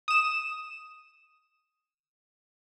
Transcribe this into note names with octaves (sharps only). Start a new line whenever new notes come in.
D#6 E7